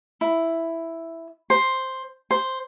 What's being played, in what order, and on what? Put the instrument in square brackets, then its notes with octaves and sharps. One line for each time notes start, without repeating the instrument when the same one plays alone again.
[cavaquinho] E4
C5
C5